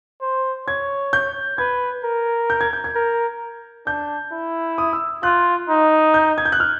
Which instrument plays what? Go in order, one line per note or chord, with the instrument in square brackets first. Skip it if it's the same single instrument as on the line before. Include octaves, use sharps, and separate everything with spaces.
[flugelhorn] C5
[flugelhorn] C#5 [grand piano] G#6
[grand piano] G6
[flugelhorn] B4 [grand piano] G#6
[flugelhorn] A#4
[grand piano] G6
G#6
G6
G#6
[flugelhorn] A#4
[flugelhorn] D4 [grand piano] G6
[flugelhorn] E4
[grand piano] D#6
E6
[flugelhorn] F4 [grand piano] F#6
[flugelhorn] D#4
[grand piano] G6
G#6
G6
F#6
F6